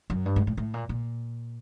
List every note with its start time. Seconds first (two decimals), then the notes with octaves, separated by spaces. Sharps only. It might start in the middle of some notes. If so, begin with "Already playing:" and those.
0.10 F#2
0.25 G2
0.36 G#2
0.47 A2
0.57 A2
0.74 A#2
0.89 A#2